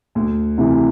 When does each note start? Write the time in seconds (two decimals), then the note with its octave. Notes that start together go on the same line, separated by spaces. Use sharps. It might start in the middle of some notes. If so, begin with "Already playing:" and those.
0.15 D2
0.58 C3 E3